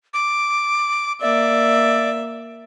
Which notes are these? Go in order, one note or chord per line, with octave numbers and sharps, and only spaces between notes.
D6
A#3 D5 E5